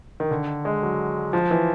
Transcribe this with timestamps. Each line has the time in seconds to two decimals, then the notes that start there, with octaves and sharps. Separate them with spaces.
0.20 D#3
0.31 D3
0.65 G#3
0.83 F#3
1.33 F3
1.51 E3